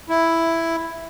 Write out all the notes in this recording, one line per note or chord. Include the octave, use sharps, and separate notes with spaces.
E4